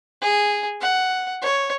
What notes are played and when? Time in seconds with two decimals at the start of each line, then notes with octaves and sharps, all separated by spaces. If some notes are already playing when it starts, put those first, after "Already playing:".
0.21 G#4
0.81 F#5
1.42 C#5